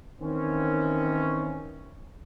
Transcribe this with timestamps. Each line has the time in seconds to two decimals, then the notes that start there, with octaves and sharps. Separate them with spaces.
0.20 D#3 E3 C4 C#4